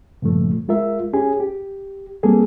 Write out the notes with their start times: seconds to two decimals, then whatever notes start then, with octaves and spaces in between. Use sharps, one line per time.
0.22 G2 A#2 C#3 F3 A3
0.68 G#3 F4 A#4 E5
1.13 C#4 G4 G#4 G#5
1.40 G4
2.23 G3 A#3 C4 G#4 A4